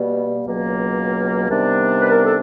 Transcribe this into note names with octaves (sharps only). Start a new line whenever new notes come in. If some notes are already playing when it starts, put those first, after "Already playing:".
Already playing: B2 G3 A#3
C#2 B2 F#3 A#3
C3 D#3 G3 B3 D4
B4
A#4
A4